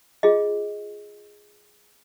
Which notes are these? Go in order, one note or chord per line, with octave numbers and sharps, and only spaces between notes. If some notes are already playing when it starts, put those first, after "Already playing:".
F4 G#4 D#5